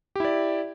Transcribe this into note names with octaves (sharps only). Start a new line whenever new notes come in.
E4 G4 D5